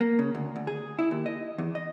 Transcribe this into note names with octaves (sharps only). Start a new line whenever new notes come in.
A#3
C#3
D2
D2
G#4
E4
D#2
D#5
E2
D#5